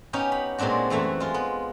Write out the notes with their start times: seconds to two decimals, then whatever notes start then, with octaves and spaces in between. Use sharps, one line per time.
0.13 B3 C#4 D#4 G4
0.32 B5
0.58 A#2 G#3 C4 D4 F#4
0.90 F#2 E3 A3 E5
1.20 G#3 F4
1.34 B3